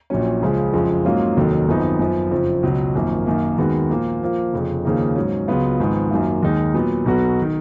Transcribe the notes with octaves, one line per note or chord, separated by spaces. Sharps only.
A#1 A#2 F#3 C#4
C#2 C#3 F3 G#3
F#1 F2 F3 G#3
G#2 F#3 A#3 C#4 F4
F1 D#2 D#3 F#3
G#1 F#2 F3 B3 D#4
F#2 F3 B3
F#1 F2 F3
C#2 B2 F#3
G#1 F#2 F3 A#3
F#2 D#3 A#3
D#2 D#3 G#3 B3 F#4
A#2 F3 A#3
A#2 F3 A#3
F1 F2 C#3
D#2 C#3 F3 A#3 D#4
G#2 F#3 C#4
C#2 C#3 F#3 B3 F4
G#1 G#2 F3 B3
F#2 D#3 F#3 A#3 F4
D#2 D#3 G#3 D#4
A#2 F#3 B3
B1 B2 F#3 B3 F#4
D#3